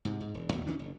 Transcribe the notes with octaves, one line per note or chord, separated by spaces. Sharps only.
G#2 C3
G#2
E1
D#2 B2 A3
D2 D#3 C#4 D4
F#1